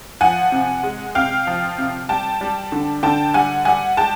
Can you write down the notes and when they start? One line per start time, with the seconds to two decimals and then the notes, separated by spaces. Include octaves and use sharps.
0.21 F3 F#5 G#5
0.52 C3
0.83 G#3
1.15 C3 F5 G5
1.47 F3
1.78 C3
2.09 G3 G5 A5
2.41 G3
2.72 D3
3.03 D3 G5 A5
3.34 G3 F#5 G#5
3.65 G3 F#5 G#5
3.97 G#3 G5 A5